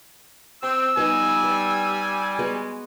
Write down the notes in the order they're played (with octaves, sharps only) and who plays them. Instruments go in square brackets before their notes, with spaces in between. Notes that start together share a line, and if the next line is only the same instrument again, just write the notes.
[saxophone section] C4 [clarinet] E6
[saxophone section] G3 [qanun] B3 D#4 D#5 [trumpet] G#5
[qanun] B4
G#3 B3 F#4